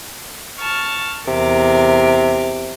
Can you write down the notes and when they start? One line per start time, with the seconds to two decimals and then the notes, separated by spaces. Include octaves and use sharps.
0.60 A5 C#6 F6
1.28 E2 C3 A#4 D6